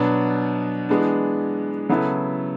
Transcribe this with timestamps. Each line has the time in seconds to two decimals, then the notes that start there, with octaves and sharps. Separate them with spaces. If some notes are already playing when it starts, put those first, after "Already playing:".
Already playing: B2 F#3 B3 D4
0.89 E3 G#3 B3 D4
1.89 C#3 F#3 B3 E4 A4